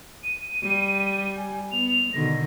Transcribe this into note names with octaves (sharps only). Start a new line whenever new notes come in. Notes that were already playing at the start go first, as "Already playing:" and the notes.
D#7
G3
G#5
B3 F7
B2 D3 D#3 A#6